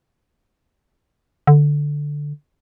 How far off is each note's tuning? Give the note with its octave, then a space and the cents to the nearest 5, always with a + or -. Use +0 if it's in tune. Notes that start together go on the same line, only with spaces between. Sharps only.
D3 +0